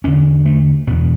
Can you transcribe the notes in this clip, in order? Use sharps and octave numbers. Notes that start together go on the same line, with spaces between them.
E2 D3 C#4
A3
E2 B2 B3